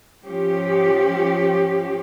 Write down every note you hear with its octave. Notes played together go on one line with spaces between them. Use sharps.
G#2 F3 C#4 G4